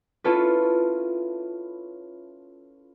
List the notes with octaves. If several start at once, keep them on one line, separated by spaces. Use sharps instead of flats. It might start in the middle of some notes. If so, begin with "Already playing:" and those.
C#4 E4 F4 A4 B4